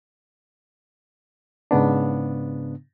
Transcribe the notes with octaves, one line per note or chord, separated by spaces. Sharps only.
G#2 C#3 B3 D4